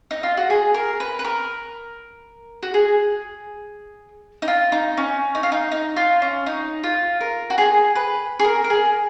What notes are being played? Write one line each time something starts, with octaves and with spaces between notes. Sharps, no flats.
D#4
F4
F#4
G#4
A#4
B4
B4
A#4
F#4
G#4
D#4
F4
D#4
C#4
D#4
F4
D#4
D#4
F4
C#4
D#4
F4
A#4
F#4
G#4
B4
G#4
A#4
A#4
G#4